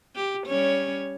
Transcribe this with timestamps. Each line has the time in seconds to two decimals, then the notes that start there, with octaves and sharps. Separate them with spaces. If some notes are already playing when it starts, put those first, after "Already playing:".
0.15 G4
0.47 G3 C#4 C#5